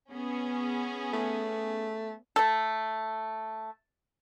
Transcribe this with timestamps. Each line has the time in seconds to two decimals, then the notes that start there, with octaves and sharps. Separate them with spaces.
0.11 B3 C#4 G#4
1.13 A3
2.36 A3 A4